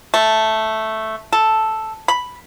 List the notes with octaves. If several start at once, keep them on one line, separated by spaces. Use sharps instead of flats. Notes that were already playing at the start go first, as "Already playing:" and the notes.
A3
A4
B5